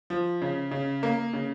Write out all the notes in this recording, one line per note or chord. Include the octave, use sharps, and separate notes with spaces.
F3
C#3
C#3
A#3
C#3